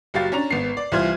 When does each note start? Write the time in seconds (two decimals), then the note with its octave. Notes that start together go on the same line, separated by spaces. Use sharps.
0.14 F#1 F#3 G4 F5 A6
0.32 C#4 D4 A#5 F7
0.50 G#1 B3 C7
0.77 D5
0.92 C2 E3 F4 C5 F6 G#6